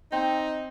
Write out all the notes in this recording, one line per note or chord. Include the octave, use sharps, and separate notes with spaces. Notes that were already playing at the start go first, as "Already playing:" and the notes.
C4 D#4